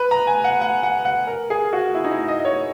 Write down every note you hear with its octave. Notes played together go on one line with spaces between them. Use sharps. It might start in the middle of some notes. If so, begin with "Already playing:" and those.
Already playing: B4
A#5
G#5
F#5
F#5
F#5
F#5
A#4
G#4
F#4
E4
D#4
E4
D#5
D#5
C#5